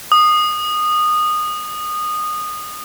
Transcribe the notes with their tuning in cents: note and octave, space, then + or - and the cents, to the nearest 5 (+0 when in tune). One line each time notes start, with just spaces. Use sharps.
D#6 -20